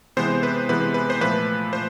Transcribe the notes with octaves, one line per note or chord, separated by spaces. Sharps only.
C3 E3 G#3 B3 C5
B4
C3 E3 G#3 B3 B4
B4
C5
A#2 F3 A3 B4
A#2 C5